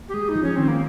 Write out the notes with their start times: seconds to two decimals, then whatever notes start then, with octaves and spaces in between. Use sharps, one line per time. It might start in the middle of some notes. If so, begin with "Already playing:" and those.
Already playing: A#3
0.09 G4
0.14 G#3 G#4
0.29 D#4
0.36 F3
0.43 C#4
0.56 D#3 C4
0.68 A#3